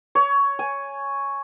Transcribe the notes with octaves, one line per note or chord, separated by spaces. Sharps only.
C#5
G#5